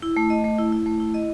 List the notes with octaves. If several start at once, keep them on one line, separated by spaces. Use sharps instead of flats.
E4
A3
D#5
A3
E4
E4
A3
E4
D#5